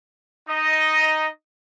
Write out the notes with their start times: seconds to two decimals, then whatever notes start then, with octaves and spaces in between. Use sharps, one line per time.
0.48 D#4 D#5